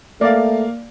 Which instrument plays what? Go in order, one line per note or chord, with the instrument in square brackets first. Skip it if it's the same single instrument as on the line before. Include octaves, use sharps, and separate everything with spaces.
[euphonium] A3 [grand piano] A#3 F5 [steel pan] D5